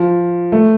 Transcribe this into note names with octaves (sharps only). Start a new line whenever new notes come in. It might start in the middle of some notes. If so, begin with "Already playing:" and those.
Already playing: F3
A3